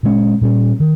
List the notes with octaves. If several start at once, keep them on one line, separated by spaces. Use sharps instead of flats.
A#2 G#3 C#4
A#2 G3 C#4
D#3